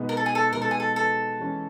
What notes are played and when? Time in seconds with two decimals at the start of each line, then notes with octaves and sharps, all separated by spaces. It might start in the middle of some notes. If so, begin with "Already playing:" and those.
Already playing: B2 G#3 B3 D#4
0.09 A#4
0.17 A4
0.26 G#4
0.35 A4
0.52 B2 G#3 B3 D#4 A#4
0.62 A4
0.71 G#4
0.80 A4
0.96 A4
1.40 E3 G#3 C#4